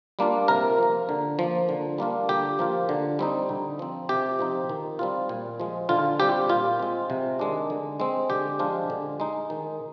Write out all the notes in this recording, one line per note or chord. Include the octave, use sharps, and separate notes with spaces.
G3 A#3 D4 F4
C3 A#4
F3 A#3
D3
F3 A#3
D3
G3 A#3 D4 F4
D3 G4
F3 A#3 F4
D3
G3 C4 D#4
D3
F3 C4
C3 G4
F3 C4 D#4
D#3
G3 C4 F4
A#2
F3 G#3
D3 F4
G3 C4 F4 G4
A#2 F4
G#3 C4
C3
D#3 G#3 D4
D3
G#3 C4
D3 G4
F3 G#3 D4 F4
D3
G#3 D#4
D#3